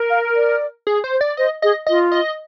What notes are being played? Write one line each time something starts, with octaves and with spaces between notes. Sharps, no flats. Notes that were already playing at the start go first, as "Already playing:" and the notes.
Already playing: A#4
F5
D5
G#4
C5
D5
C5 D#5
G#4 D#5
F4 D#5
D#5